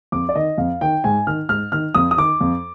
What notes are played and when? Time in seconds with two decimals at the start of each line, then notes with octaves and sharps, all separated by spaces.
0.12 F2 D6
0.29 D5
0.35 D#3 D#5
0.58 F2 F5
0.81 D#3 G5
1.04 G#2 G#5
1.27 D#3 F6
1.49 G#2 F6
1.72 D#3 F6
1.95 F2 D#6
2.11 D#6
2.17 D#3 D6
2.41 F2